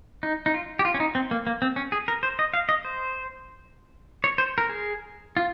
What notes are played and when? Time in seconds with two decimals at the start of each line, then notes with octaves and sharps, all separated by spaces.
0.23 D#4
0.46 D#4
0.54 F4
0.79 G4
0.85 F4
0.94 C#4
1.00 D#4
1.15 C4
1.31 A#3
1.47 A#3
1.62 C4
1.76 C#4
1.92 G#4
2.08 A#4
2.23 C5
2.39 D#5
2.54 F5
2.69 D#5
2.85 C5
4.24 C#5
4.38 C5
4.58 A#4
4.69 G#4
5.37 F4